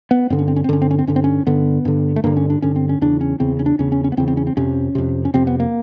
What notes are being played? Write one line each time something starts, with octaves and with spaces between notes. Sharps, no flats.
B3
G2 D3 C4
C#4
C4
C#4
C4
G2 D3 C#4
C4
C#4
C4
G2 D3 C#4
C4
C#4
G2 D3 B3
G2 D3
A3
G2 D3 A#3
C#4
D4
G2 D3 C#4
C4
C#4
E2 C#3 D4
C#4
E2 C#3 C4
C#4
D4
E2 C#3 C#4
C#4
C#4
B3
E2 C#3 C4
C4
C#4
C4
F2 C3 C#4
F2 C3
C#4
F2 C3 C4
B3
A#3